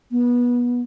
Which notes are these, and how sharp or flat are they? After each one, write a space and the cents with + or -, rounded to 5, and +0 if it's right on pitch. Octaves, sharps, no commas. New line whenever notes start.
B3 -25